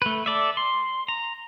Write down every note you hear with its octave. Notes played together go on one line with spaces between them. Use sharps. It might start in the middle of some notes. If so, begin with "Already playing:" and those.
A3 B4
A4 D5 E5
C6
A#5